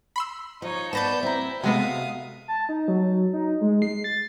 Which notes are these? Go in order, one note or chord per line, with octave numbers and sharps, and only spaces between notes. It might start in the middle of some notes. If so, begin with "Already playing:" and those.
B5 C6 E6
F3 D#4 C#5
B3 B4 D5 A5 G6 A6 A#6 E7
C4 E4 A#5
C3 G#3 B3 F#4 A4 E5 F5 D#6
A5
D#4
F#3
D#4
G#3
C7
A6